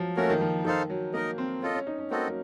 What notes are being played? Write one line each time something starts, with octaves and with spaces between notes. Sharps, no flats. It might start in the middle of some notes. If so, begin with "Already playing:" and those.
Already playing: F3 F#3
A3 A#3 C#4 F#4 A#4 C#5
D#3
F3
D#3 D#4 A4 C5 F5
F#3
A#3 D#4 A#4 D#5
C4
C#4 F4 A4 D#5
C#4
D#4
C#4
A#3 C4 F#4 A4 D#5
F#3